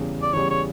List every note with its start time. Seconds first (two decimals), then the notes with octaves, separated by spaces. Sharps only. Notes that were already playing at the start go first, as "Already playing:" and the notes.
Already playing: E2 C#3 G3
0.22 D5
0.33 E2 C#3 G3 C#5
0.50 C#5